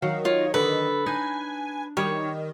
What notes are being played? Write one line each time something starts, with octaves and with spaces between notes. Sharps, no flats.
D#3 F#3 F5
F4 C#5
D3 A4 B4
D4 D#4 G#5
D#3 G3 C#5